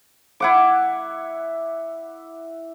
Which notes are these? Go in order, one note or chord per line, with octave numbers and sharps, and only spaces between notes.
E4 F#5 D6